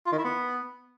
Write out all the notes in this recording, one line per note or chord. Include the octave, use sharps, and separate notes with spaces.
F4
D#3
E4
B3